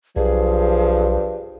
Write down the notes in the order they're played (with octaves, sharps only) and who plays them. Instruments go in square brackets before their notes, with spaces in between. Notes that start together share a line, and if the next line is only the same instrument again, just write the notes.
[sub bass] B1 [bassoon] G2 [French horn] F3 [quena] G#4